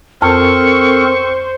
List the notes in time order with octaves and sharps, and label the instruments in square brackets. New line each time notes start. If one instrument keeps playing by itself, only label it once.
[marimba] F2 F6 [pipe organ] C4 A4 A#4 [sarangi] C5 [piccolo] C#6